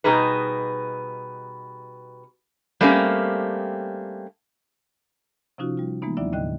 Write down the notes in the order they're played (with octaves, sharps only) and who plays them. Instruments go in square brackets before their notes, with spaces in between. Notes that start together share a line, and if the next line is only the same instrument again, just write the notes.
[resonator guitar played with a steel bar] B2 G3 D#4 G#4 B4
G3 A3 A#3 C4 C#4 G4
[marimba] C3 F3 C#4 D#4 F4 F#4
G3 F4
E3 G#3 A#3 B3 D#4
D#2 F#3 D4 E4 D5 E5
D#2 A2 D3 D#5 G5 F#6